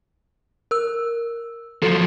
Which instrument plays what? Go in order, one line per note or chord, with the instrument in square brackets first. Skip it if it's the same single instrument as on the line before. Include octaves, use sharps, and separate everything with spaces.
[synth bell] A#4 E6
[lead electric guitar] F3 F#3 [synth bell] A4